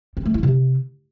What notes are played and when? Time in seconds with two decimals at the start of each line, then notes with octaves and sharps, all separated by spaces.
0.17 C4
0.25 A3
0.34 E4
0.43 C3